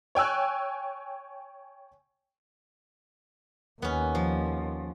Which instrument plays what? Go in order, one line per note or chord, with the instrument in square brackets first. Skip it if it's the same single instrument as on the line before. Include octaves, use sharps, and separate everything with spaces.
[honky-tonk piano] C#5 G5 G#5 E6 F#6
[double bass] D#2 [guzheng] B3 C#4
[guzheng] F3